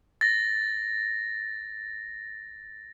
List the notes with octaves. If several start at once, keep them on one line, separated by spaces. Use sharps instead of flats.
A6 A#6